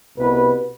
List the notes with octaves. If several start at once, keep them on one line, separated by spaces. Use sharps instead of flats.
C2 B2 B4